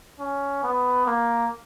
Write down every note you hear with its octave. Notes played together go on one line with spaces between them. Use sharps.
C#4
B3
A#3